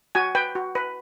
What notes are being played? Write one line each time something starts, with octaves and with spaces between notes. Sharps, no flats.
F#4 G#5
B4 G5
F#4
B4